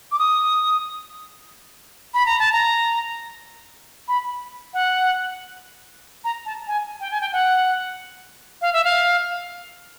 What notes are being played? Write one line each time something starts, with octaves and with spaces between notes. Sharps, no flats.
D6
D#6
B5
A#5
A5
A#5
B5
F#5
A#5
A5
G#5
G5
G#5
G5
F#5
F5
E5
F5